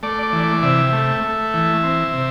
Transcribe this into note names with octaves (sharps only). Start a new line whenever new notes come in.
A3 D5
D5
E3
D5
C3 E5
A3
A3
E3
C4
C3